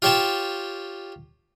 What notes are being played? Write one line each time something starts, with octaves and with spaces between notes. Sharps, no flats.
F4 G4 C#5 G5 A5